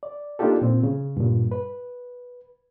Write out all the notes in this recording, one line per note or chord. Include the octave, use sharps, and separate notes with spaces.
D5
A#3 D4 D#4 F4 G4 A4
A#2 C4
C#3
G2 A#2
B4